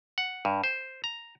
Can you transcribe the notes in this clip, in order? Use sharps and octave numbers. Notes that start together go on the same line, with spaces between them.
F#5
G2
C5
A#5